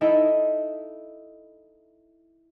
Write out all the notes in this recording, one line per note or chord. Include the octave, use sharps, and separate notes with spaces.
D#4 E4 A4 D#5 E5